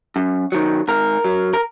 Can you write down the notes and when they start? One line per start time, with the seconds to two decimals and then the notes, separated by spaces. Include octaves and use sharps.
0.16 F#2
0.52 D#3 F#3
0.88 G#2 A#4
1.24 F#3
1.53 A#4